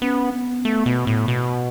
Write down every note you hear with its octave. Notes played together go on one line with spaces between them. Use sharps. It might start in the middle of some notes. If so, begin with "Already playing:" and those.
B3 C#4
B3
A3
B2
A2
B2